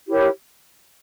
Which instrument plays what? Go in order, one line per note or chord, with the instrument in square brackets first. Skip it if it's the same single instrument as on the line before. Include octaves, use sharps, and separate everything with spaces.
[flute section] E4 G4 A#4 C#5